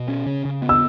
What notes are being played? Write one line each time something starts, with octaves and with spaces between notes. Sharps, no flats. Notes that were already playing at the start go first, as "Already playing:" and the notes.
Already playing: B2
C#4
C#3
C#3
B3
E6